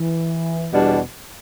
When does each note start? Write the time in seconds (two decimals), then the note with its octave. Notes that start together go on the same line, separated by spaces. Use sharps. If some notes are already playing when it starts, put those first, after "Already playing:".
Already playing: E3
0.71 E2 B2 G3 D4